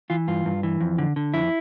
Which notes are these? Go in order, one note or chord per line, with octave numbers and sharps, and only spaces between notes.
E3 F4
G2 F4
G2
E3
F2
D3
D3
F2 E4